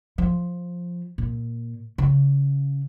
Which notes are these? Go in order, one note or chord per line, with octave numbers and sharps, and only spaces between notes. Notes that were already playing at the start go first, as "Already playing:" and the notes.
F3
A#2
C#3